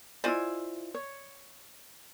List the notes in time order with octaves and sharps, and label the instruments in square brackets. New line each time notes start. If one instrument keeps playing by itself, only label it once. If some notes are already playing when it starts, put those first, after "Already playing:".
[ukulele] E4 F4 C5 [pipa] D5 D#5 G#5
[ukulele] C#5